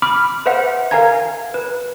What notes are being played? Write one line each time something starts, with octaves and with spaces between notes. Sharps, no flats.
B5 D6 F6
B4 C5 E5 F#5
A#4 F5 G#5 A#5 G#6
B4